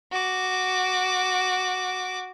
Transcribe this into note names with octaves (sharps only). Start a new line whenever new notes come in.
F#4 D6